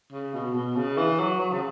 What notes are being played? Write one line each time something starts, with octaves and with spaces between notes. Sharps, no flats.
C#3
B2
B2
C#3
E3
F#3
F#3
C#3